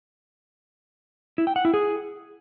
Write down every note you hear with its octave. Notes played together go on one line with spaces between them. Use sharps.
E4
G5
F#5
E4
G#4